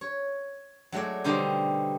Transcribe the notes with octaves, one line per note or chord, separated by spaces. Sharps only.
C#5
F#3 G#3 A3 A4 D5
B2 D3 G3 D#4 C5 D5